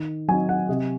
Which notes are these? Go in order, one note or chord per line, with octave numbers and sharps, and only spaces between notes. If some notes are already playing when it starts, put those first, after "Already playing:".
Already playing: D#3
F#3 C4 D#4 G#5
F#5
C3 D#5